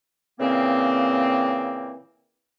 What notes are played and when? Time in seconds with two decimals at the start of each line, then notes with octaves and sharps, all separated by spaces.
0.39 A#2 C#3 E3 A#3 C4